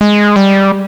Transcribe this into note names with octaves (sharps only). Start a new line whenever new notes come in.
G#3
G3